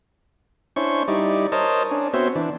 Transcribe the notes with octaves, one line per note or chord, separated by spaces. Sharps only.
C#4 D4 E4 C5 C#6
G3 D#4 E4 D5
A#4 C5 C#5 D#5 A5
C#4 D4
B3 C4 F#4 C5 C#5 E5
E3 D4